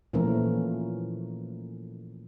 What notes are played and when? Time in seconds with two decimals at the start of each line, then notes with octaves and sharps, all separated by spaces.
0.13 A#2 E3 F3 A3 C#4 A#4